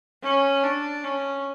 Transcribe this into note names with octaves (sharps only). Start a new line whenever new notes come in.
C#4
D4
C#4